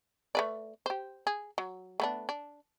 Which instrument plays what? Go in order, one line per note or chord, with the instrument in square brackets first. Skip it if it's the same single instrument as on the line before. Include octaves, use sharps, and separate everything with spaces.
[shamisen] A3 B4 D5
G4 C5
G#4
F#3
A3 B3 D4
D4